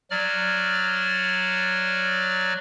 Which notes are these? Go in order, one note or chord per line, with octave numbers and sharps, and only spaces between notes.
F#3 D5 F6